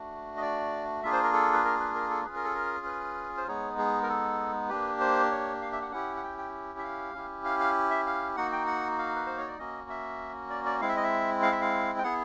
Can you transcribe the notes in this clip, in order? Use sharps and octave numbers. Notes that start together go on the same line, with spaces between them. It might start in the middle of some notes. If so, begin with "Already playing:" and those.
Already playing: A3 D4 F#4
D#5
D5
A#3 D4 F4 G#4 E5
C5
A#4
A4
B4
A#4
B4
A#4
A4
C#4 F4 G#4 B4
A#4
A4
A#4
B4
C5
G#3 B3 D#4 G#4 C#5
G#4
A#4
A4
A#3 D4 G4 B4
C5
C#5
F5
E5
F#5
C#4 E4 G4 F#5
F#5
G5
G5
E5
F5
C#4 E4 G4
F5
F5
E5
F5
A#3 D#4 F#4 F#5
G5
F#5
F5
B4
C5
C#5
D5
A#3 C#4 F#4 D#5
E5
D5
D5
G#3 C4 E4 F5
E5
D#5
E5
F5
E5
F5
G5
B3 E4 G#4 F#5